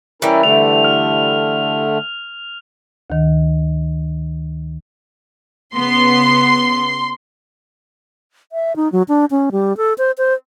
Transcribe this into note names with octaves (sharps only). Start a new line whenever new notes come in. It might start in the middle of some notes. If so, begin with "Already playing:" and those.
E3 G3 C#4 E4 A#4
D3 A3 F7
F6
D2 D#3
C#3 B3 C6
E5
D#4
F#3
D4
C#4
G3
A4
C5
C5